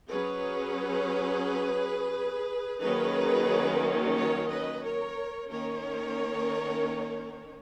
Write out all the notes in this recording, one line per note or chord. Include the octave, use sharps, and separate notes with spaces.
F#3 C#4 G#4 B4
D#3 F#3 A#3 C#4 G#4 B4
A#4 C#5
B4 D#5
A#4 C#5
D#3 A#3 C#4 A#4 C#5